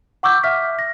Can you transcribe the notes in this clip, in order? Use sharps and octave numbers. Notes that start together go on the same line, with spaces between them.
F#5 C#6 D6 E6 G6
E5 F6 B6
A#6